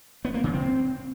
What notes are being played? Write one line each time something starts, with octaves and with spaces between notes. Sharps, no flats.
B3
A#3
C#3
C4